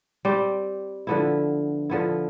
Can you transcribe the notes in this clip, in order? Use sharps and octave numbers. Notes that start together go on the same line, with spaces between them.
G3 C4 G4
D3 F3 B3 E4
D3 F3 B3 E4